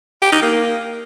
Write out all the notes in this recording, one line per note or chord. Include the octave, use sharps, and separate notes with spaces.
G4
D#4
A#3